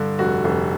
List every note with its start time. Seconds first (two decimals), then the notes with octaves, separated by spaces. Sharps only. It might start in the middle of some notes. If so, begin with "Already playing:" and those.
Already playing: G2 D3
0.19 F1 F#4
0.44 F1